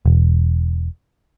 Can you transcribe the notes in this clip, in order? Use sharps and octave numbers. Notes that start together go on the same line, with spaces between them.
E1